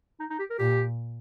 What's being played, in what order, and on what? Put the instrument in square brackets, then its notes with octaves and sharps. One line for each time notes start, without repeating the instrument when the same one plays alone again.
[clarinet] D#4
D#4
G4
A#4
[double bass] A#2 [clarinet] G4